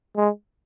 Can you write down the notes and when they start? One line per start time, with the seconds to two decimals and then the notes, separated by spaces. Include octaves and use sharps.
0.17 G#3